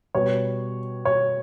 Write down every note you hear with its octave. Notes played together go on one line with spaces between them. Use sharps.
B2 G3 B3 C#5
C#5